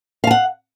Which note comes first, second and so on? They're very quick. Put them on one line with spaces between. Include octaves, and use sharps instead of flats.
F5 A5 F#5